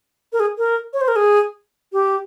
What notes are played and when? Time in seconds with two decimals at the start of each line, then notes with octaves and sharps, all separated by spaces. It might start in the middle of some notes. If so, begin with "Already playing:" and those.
0.33 A#4
0.40 G#4
0.58 A#4
0.93 C#5
1.01 C5
1.08 A#4
1.16 G#4
1.93 G4